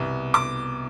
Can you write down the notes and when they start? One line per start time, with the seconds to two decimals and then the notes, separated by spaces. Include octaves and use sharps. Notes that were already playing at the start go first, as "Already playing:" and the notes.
Already playing: C2 B2 B3
0.34 D6